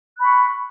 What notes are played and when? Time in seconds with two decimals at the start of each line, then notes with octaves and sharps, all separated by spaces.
0.17 F#6
0.20 B5
0.22 C#6